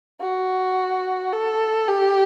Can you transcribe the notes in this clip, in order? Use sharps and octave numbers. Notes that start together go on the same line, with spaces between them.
F#4
A4
G4